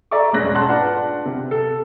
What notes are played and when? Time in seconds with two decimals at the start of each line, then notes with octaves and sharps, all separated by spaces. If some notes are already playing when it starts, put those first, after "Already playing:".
0.11 A4 D5 E5 A#5 C#6 D6
0.33 E1 G#2 G#3 C#4 F#6 A#6
0.54 F#5 A5 C6 F#6
0.68 D4 F4 B4 D5 F#5 A5
1.25 C3
1.51 A4